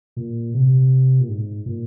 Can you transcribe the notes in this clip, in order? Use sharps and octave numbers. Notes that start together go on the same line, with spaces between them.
A#2
C3
A#2
G#2
A#2